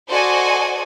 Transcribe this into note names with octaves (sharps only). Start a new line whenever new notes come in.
F#4 A4 C5 D5 D#5 G#5